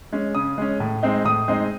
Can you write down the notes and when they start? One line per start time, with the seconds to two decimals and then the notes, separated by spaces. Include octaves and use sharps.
0.13 G#3 C#4
0.35 C#3 D#6
0.58 G#3 C#4
0.80 A2
1.03 G#3 C4 D#4
1.25 A2 D#6
1.48 G#3 C4 D#4